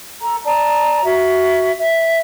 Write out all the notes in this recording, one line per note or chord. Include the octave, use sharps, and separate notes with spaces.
A4 A#5
D5 A5 A#5
F#4 E5
E5